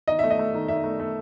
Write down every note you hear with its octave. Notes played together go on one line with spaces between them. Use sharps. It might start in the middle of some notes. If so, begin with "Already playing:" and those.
D#3 D#5
A3 E5
D#5
A3
D#3
D#3 E5
A3
A3